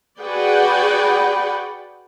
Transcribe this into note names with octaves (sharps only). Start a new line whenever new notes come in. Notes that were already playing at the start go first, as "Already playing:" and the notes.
F#4 G#4 B4 D5 F#5 G5